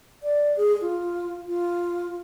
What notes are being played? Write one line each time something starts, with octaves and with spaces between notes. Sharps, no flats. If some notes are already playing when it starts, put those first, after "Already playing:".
D5
G#4
F4
F4